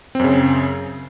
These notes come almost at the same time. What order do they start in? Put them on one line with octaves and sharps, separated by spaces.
C4 F#2 C#3